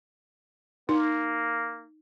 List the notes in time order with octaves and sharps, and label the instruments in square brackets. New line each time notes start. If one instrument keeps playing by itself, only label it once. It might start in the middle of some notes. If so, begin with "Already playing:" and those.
[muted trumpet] A#3 [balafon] D#4